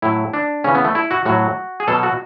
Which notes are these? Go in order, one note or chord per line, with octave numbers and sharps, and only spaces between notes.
A2 F#3 E4
D4
C#3 E3 C#4
B3
A3
E4
F#4
A2 F#3 F#4
G#4
B2 F#3 A4
F#4